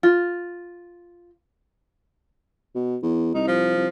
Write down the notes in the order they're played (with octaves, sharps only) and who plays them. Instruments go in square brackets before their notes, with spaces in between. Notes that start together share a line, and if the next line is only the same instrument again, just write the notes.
[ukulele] F4
[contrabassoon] B2
E2
[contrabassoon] C2 [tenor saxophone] D#4
[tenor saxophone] F3
[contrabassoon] C2